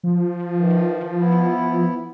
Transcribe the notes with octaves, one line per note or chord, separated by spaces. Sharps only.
F3
D#3 E3
B3 E4